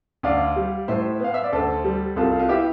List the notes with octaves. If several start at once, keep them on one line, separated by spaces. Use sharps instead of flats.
D2 D5 F5
G3
A2 C5 E5
B3 F5
E5
D5
D2 A4 C5
G3
C2 F4 A4
F4
B3 E4 G4